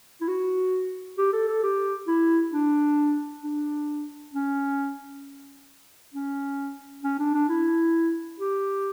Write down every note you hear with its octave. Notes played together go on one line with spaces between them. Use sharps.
E4
F#4
G4
A4
A4
G4
E4
D4
D4
C#4
C#4
C#4
D4
D4
E4
G4